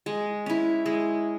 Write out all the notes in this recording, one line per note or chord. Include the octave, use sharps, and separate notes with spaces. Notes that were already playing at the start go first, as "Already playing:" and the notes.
G#3
C#4 E4
G#3